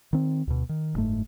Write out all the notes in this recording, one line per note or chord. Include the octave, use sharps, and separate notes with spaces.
D#3 C4
D2 B2
D#3
F#1 G#2 A3